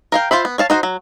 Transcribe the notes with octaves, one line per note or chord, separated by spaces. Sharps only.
A#4 F5 G5
F4 C5 E5 B5
B3
C#5 F5 A5
D#4 F#4 C5
F#3